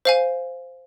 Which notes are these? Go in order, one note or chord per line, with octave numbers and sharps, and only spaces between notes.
C5 F5 G#5